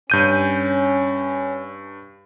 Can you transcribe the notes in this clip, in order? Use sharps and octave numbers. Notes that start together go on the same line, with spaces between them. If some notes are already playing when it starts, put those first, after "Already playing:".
G2 C#4 G6 D#7